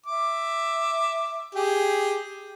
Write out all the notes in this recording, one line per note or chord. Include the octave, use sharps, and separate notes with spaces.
E5 D6
G4 G#4